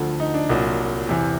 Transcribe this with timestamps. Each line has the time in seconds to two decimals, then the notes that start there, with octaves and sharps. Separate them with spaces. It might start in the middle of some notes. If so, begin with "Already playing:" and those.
Already playing: D2 D3 F3
0.20 D#4
0.34 D4
0.49 C2 A#2 F#3
1.07 E2 C3 E3